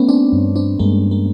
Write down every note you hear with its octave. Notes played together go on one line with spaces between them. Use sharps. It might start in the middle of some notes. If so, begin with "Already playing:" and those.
Already playing: A3 B3 C#4
C4 D4
G2
C4 D4
G2 G#3 A#3
G#3 A#3